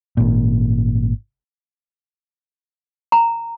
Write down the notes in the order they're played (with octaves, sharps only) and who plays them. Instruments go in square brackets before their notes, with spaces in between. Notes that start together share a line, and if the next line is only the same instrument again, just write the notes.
[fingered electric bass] G#1 A#2
[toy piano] A#5